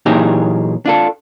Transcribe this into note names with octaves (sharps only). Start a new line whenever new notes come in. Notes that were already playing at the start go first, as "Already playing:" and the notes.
A#2 E3 F#3 D#4 G4 G#4
D4 F4 A4